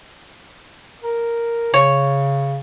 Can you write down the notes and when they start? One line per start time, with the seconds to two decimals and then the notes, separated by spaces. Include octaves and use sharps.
1.04 A#4
1.74 C#3 C#5